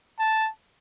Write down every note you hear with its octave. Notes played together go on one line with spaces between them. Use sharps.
A5